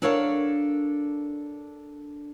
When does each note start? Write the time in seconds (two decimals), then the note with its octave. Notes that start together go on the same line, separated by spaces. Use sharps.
0.02 D4 A4 A#4 C#5 F5 F#5